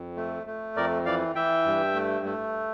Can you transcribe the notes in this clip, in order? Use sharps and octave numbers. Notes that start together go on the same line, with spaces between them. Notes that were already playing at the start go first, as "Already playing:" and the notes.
Already playing: F2
A3
A3
F2 A#4 D5
E3 D5 F5
E3 E5 G5
G2
A3
A3